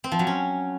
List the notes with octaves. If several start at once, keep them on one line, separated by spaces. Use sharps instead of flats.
C4
F3
F#3
C#4